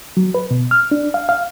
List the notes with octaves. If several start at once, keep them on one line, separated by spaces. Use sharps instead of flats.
F#3
B4
B2
F6
D4
F5
F5